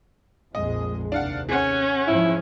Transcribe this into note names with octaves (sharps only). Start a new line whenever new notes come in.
A#1 F2 G#3 D#5
D#2 C3 D4 F5 F#5
C#4 G#4 F#5
G#2 F3 E4